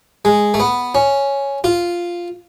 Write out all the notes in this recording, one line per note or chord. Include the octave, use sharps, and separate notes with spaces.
G#3
A3
B3
C#4
F4